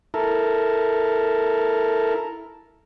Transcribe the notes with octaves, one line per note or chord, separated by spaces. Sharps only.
E4 A4 A#4